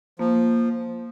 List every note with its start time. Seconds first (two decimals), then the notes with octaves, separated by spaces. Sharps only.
0.19 F3 A#3
0.35 A#3